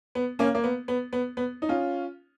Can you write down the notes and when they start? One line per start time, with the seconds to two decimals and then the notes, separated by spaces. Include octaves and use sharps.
0.15 B3
0.39 A#3 C#4
0.55 A#3
0.64 B3
0.88 B3
1.13 B3
1.37 B3
1.62 D#4
1.69 C#4 F4